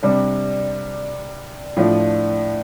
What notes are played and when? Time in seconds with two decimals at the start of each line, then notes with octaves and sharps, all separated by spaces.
0.03 C3 G3 D4
1.77 A2 F3 D4